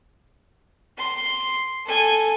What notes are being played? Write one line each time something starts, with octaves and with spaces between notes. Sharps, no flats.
C6
A4 G#5